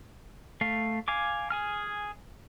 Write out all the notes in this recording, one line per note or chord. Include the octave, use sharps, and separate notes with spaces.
A3 F5
F5 G#5 D6
G#4 G#5 F6